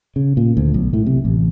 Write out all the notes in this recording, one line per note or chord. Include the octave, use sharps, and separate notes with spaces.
C#3
A#2
D2
B1
A2
C3
A1